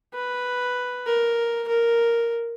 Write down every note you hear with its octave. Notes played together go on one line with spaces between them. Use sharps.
B4
A#4
A#4